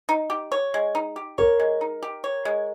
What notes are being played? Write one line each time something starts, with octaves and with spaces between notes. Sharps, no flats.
D#4
G4
C#5
G#3
D#4
G4
A#4 C#5
G#3
D#4
G4
C#5
G#3